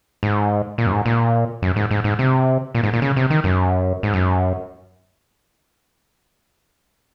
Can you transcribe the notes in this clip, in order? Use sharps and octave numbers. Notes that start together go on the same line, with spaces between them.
G#2
A#2
F#2
G#2
A#2
F#2
G#2
G#2
G#2
C3
A#2
G#2
A#2
C#3
C3
D#3
F#2
G#2
F#2